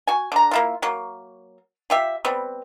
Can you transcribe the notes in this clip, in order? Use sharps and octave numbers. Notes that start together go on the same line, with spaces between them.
F#4 G#5
D3 A#5
A#3 E4 F4
F#3 A#3
F4 G4 E5
G3 B3 C4